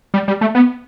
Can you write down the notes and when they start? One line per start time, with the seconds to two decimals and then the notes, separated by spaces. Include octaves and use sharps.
0.14 G3
0.28 G3
0.41 A3
0.55 B3